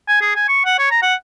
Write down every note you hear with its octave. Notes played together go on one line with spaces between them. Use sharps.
G#5
G#4
G#5
C#6
F#5
C#5
A#5
F#5